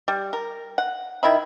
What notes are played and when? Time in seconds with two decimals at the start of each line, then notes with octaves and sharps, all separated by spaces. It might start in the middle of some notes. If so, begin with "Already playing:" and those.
0.08 G3
0.33 A#4
0.78 F#5
1.23 D#3 E4 E5 B5